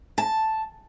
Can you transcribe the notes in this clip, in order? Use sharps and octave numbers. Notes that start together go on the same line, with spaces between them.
A5